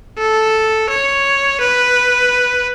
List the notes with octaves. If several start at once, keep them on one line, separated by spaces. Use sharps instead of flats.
A4
C#5
B4